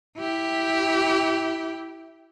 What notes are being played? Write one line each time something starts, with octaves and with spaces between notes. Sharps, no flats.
E4 G4